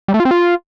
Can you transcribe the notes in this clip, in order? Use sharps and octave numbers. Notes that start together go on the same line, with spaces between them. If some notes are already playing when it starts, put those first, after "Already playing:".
G3
A3
F4
C4
F4